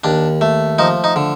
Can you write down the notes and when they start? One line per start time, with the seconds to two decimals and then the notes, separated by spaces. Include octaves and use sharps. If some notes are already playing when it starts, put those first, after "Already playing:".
0.04 D#2 D4
0.41 A3
0.79 F3 D#4
1.04 D#4
1.16 D3